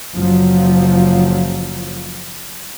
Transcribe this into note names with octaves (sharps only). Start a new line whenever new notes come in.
F#1 F3 F#3